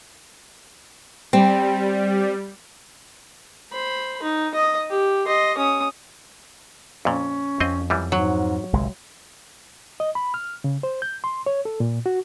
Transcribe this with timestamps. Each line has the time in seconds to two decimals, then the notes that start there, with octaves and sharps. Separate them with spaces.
1.33 G3 C4
3.72 C5 B5
4.22 D#4
4.54 D#5 D#6
4.90 G4
5.26 D#5 C6
5.57 C#4 D#6
7.05 F2 A#2 C#4
7.60 F2 C4 D#5
7.90 F#2 E3 G3
8.12 G#2 F#3
8.73 G1 C2 G#3
10.00 D#5
10.15 B5
10.34 F6
10.64 C#3
10.83 C5
11.02 G6
11.24 C6
11.46 C#5
11.65 A4
11.80 A#2
12.06 F#4